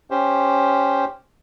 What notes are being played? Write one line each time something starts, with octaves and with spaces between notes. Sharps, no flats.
C#4 G4 C5